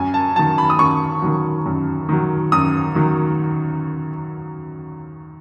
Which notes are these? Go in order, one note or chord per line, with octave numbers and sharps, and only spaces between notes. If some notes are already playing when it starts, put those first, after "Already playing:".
Already playing: F#2 G#5
A5
D#3 F#3 A5
B5
D#6
F#2 C#6
D#3 F#3
F#2
D#3 F#3
F#2 D#6
D#3 F#3